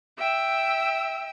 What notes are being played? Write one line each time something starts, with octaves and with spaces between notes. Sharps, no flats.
E5 G5 E6